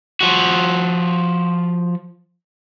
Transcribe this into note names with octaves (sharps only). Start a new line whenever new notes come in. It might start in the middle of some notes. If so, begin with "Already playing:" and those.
F3 F#4